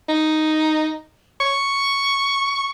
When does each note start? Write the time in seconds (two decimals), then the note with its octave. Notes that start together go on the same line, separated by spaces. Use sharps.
0.08 D#4
1.40 C#6